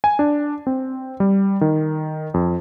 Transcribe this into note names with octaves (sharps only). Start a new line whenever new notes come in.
G#5
D4
C4
G3
D#3
F2